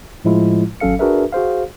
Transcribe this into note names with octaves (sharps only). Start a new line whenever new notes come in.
A2 F3 G#3 E4 F4
G#1 F#3 C#4 A4 F5 C#7
D4 F#4 G#4 A#4 B4 E5
F#4 G#4 C5 F5